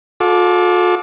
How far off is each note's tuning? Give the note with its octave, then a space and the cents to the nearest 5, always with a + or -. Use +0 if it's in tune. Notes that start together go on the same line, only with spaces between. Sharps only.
F4 +45 A4 -20 D6 +0